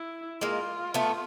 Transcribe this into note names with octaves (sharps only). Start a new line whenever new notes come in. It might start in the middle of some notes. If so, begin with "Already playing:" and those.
Already playing: E4
G#3 A#3 F4
A3 B3